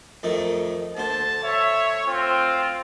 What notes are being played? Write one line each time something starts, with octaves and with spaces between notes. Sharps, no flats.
F2 D#3 A3
D2 C5 A5
C#5 E5
C4 F4